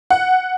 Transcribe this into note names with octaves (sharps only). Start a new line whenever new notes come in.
F#5